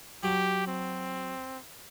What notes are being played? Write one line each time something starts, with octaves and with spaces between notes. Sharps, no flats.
F#3 G4
C4